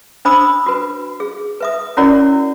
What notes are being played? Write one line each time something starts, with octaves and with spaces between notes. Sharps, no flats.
D4 C5 B5 D#6 E6
F#4 B4
G#4
B4 E5 D#6
C#4 E4 F#4 A#4 C#5 D5